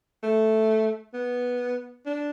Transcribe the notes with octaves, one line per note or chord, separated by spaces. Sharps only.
A3
B3
D4